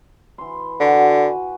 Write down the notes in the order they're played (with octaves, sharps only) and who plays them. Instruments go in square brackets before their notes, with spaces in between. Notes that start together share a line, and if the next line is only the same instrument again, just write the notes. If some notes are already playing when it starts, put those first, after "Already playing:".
[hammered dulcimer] E3 C6
[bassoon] D3 [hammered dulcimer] F#4 G#5 B5